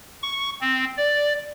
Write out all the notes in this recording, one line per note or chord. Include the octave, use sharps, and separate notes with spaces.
C#6
C4
D5